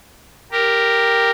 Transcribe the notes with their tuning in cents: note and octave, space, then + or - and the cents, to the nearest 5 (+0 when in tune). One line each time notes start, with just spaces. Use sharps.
G4 +0 A#4 +0